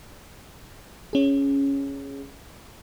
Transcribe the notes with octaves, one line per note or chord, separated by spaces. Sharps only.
C#4 G#4